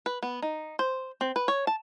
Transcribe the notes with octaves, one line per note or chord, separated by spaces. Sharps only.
B4
B3
D#4
C5
C4
B4
C#5
A5